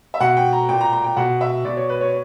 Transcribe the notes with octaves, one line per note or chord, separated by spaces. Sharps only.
E5
B2 F#5
G5
A#5
A#2 G5
A#5
A#5
G5
B2 F#5
E5
B2 D5
C#5
B4
C#5